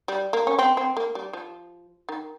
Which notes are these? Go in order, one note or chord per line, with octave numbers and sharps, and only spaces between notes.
G3
A#3
C#4
C4
C4
A#3
G3
F3
D#3